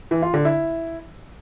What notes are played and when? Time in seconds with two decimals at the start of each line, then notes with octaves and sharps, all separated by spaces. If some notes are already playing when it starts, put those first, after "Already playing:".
0.11 E3
0.22 F4
0.34 D3
0.45 E4